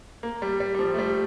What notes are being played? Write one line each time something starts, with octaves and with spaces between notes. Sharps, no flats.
A#3
G3
G3
G3
F3
A3
G3